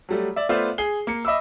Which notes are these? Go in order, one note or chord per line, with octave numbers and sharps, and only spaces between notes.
F#3 G3 A3
D5 E5
A3 B3 F4 C5 D5 E5
G#4 C7 G7
A#3 C#7
D#5 E5 B5 D6 E6